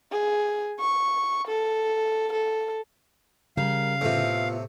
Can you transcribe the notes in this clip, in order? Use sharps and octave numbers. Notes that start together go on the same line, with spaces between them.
G#4
C#6
A4
A4
C#3 G3 A#4 F5
A2 C3 B3 F4